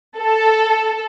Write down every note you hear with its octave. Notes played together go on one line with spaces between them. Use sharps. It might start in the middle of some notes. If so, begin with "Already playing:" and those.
A4